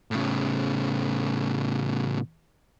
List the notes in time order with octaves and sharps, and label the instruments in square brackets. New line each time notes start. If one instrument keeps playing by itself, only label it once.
[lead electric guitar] A2 C#3